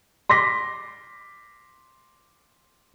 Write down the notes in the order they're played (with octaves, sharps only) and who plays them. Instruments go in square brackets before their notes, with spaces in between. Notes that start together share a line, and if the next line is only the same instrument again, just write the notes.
[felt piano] C6 D6 A#6 B6